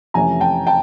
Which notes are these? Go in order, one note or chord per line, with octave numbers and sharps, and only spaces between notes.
F2 C3 E3 A3 C#4 G#5 A#5
G5 A5
G5 A5